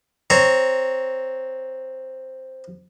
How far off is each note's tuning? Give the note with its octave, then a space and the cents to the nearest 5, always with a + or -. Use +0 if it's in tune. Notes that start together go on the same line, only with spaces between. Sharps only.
C4 +0 C#5 +0 A#5 +0